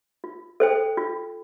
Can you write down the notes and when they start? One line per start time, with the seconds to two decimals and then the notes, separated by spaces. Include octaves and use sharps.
0.24 F4
0.60 A4 C5 G5
0.97 F4